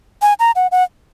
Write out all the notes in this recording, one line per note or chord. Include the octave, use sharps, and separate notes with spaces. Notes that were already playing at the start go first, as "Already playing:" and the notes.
G#5
A#5
F#5
F#5